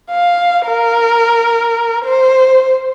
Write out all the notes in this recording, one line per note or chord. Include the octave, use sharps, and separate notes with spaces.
F5
A#4
C5